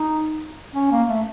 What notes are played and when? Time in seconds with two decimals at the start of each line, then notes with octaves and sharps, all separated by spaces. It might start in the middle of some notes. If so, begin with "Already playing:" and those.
Already playing: D#4
0.75 C#4
0.91 A#3
1.09 A3